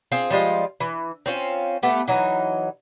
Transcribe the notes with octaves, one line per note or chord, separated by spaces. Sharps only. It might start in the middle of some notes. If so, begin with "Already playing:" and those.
C4 F4 G#4
F3 G3 G#3 F4
E3
C4 C#4 F4
A3 B3 G4
E3 F#3 D#4